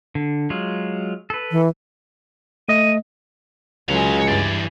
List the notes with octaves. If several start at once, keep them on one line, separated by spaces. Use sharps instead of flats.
D3
F#3 G#3 F4
A4 B4
E3
A3 D#5 D#7
C#2 F#3 G#3 C#5 F5
G2 E3 D5